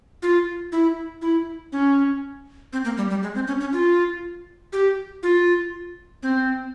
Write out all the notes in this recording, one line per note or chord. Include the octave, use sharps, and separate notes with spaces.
F4
E4
E4
C#4
C4
A#3
G3
G3
G#3
C4
C#4
C#4
F4
G4
F4
C4